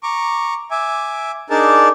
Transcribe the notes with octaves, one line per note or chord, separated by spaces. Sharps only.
A#5 C#6 D6
E5 G#5 D6
D4 D#4 G#4 A#4 D5 A5